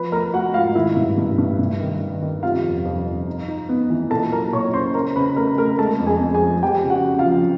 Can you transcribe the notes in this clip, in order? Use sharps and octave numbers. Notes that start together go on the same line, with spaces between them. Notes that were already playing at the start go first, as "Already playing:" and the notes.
Already playing: F3 B4 B5
A3 A#4 A#5
A3 F#4 F#5
G#2 F4 F5
D#3 E4 E5
G2
G2
G2
G2
D#3
D#3
D#3
C3 F4 F5
F2
F2
F2
D#4
D#4
B3
E3
A#2 A4 A5
F#3 A#4 A#5
A#2 C#5 C#6
C#4 C5 C6
C#3 A#4 A#5
C#3 B4 B5
A3 A#4 A#5
A3 A#4 A#5
G#3 A4 A5
F2
G#4 G#5
F2
G#4 G#5
F3
F3 G4 G5
C#3
F#4 F#5
C#3
F4 F5
F3